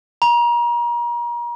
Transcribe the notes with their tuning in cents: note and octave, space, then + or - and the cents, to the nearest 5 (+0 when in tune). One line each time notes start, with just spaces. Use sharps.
A#5 +35